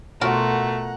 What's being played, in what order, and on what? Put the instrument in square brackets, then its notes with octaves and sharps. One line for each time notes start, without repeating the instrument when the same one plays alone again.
[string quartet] B2 A3 [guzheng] F4 F#4 A#4 [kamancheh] F#5 A#5